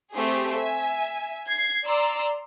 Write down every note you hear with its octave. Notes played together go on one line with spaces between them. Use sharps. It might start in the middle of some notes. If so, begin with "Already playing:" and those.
A3 C4 G4 G#4
E5 G#5
G#6 C7
D5 A#5 C6 E6